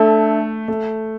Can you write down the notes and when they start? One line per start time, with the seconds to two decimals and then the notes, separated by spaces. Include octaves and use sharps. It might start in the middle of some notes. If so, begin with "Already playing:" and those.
Already playing: A3 D4 A4 E5 A5
0.68 A3